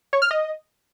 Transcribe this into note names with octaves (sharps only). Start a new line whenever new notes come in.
C#5
F6
D#5